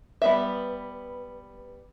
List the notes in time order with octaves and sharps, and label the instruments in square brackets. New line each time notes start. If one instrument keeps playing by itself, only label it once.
[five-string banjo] G3 B3 E5 [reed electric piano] B4 B5